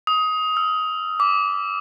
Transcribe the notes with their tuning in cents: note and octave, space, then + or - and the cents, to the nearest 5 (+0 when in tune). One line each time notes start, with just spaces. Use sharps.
D#6 +20
E6 +40
D6 -20